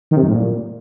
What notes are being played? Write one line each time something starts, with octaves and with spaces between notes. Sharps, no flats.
D#3
C3
F#2
A2
A#2